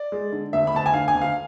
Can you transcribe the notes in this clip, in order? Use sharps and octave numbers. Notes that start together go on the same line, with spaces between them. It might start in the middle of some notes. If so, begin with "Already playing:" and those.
Already playing: D5
G#3
D3
D2 E5
B5
D2 A5
G#5
D3 F5
G#5
D2
F5